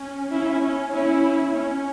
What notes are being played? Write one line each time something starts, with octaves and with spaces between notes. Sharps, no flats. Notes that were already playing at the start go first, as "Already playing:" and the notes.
Already playing: C#4
C#4 E4
C#4
C#4 E4
C#4